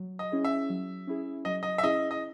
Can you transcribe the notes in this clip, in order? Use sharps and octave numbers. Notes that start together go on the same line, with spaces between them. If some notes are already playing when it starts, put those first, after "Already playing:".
Already playing: F#3
D#5
C#4 E4 G#4
E5
F#3
C#4 E4 G#4
F#3 D#5
D#5
E5
C#4 E4 G#4 D#5
D#5